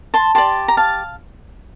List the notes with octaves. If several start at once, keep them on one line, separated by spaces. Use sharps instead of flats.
A5 C6
G4 D5 A5 C6
A#5
F5 A5